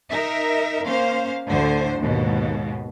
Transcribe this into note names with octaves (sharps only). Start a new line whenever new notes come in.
D#4 A#4 E5
A#3 C#4 C5 F5
D2 A2 D3 C5
D#2 G#2 B2